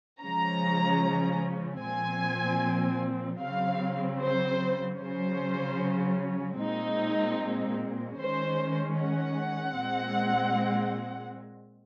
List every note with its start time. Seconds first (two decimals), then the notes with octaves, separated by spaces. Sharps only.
0.22 C#3 F3 G#3 C#4 A#5
1.82 A#2 F3 C4 G#5
3.41 C#3 F#3 C4 F5
4.22 C5
5.00 C#3 F#3 C#4 C5
6.60 A#2 G#3 C4 D#4
8.19 D#3 G#3 C#4 C5
8.98 F#5
9.78 A#2 G#3 C4